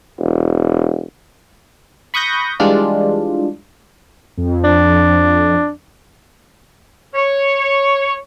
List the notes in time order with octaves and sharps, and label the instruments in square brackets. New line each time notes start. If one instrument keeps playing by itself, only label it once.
[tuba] E1
[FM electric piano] B5 C#6 D#6 F#6 G6 A#6
E3 G3 G#3 D4 F4
[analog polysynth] F2
[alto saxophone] D4
[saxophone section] C#5